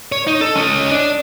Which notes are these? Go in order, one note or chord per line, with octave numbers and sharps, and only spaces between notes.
C#5
D#4
A4
C#4 D#5
D4